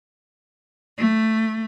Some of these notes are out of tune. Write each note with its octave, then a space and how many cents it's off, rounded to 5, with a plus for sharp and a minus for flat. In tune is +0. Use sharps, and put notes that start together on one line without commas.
A3 +5